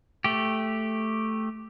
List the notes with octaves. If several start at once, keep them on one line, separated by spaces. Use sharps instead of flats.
A3 G4